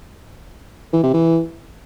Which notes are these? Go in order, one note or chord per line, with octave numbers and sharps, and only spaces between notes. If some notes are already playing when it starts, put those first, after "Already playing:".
E3
C3
E3